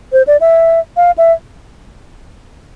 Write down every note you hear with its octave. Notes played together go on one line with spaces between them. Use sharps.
C5
D5
E5
F5
E5